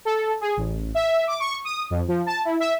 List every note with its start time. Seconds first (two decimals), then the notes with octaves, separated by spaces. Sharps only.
0.05 A4
0.41 G#4
0.57 A1
0.95 E5
1.27 D6
1.40 C#6
1.65 D#6
1.90 F2
2.08 F3
2.26 A5
2.45 E4
2.60 E5